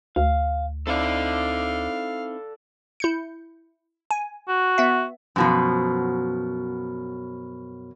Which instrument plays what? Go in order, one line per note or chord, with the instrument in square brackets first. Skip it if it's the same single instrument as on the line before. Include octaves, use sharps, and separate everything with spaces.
[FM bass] D2 [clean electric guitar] F5
[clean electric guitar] C4 D#4 E4 [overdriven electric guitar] A4 D5 [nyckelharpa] F5
[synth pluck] E4 G6 C#7
G#5
[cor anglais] F#4
[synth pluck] B3 E5
[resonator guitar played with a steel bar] F#2 B2 F3